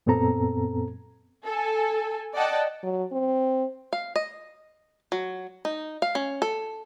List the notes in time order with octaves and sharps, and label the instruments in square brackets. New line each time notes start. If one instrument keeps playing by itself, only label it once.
[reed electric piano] F#2 A#2 B3 C4 A4 A#5
[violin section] A4 G#5
D5 D#5 F#5 G5 A5
[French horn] F#3
C4
[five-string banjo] F5
D#5
F#3
D#4
F5
C#4
A4